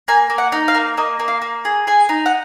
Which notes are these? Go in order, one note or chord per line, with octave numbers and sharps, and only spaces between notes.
A#3 G#5
A#3
F#5
D#4
F5
A#3
A#3 D#5
A#3
F5
A#3
G#4
G#4 G#5
D#4
F#5